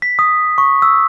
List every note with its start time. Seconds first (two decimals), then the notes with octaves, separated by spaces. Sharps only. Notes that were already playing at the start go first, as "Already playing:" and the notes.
0.02 B6
0.19 D#6
0.58 C#6
0.82 E6